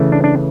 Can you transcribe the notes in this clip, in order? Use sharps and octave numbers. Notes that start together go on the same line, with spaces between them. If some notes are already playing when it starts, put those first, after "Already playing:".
Already playing: C#3 E3 A3
D4
D4